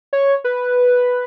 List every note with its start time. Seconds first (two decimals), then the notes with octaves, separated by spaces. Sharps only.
0.13 C#5
0.44 B4